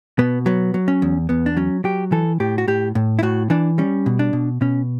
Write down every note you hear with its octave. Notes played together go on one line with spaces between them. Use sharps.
B2 B3
F#3 B3
F#3
C#4
E2
E2 B3
D4
F#3 C#4
F#3 G4
E3 A4
A2 G4
F#4
A2 G4
A2
E4
A2 F#4
E3 D4
G3 C#4
B2
D4
B2
B2 C#4